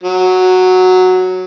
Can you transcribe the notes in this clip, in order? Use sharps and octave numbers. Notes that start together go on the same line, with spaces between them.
F#3